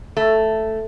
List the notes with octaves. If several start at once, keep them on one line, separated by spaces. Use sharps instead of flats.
A3